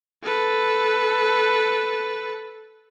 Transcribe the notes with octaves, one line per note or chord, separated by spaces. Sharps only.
A4 B4